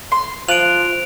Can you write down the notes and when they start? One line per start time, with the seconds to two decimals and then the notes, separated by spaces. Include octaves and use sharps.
0.12 C6
0.48 F3 F4 F#6 D7 F7